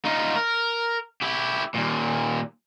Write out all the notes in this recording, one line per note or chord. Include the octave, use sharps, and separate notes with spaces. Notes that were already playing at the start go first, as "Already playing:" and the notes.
D#4 F4
A#4
E4 G4
D#2 A#2